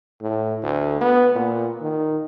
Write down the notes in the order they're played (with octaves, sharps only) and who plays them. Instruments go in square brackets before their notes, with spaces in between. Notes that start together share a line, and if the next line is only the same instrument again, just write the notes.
[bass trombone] A2
D2
B3
A#2
D#3